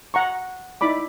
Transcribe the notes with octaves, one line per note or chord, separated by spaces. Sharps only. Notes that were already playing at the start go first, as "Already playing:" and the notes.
F#5 A#5 C#6
D#4 E4 D5 B5 D6